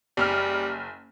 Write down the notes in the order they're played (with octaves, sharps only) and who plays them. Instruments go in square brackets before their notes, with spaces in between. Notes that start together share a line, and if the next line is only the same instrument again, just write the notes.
[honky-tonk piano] F#1 F6 [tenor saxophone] G3